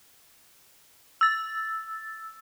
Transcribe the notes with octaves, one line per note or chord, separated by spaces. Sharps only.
E6 A6